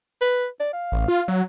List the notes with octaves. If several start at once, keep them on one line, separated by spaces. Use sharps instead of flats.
B4
D5
F5
A1
F4
F#3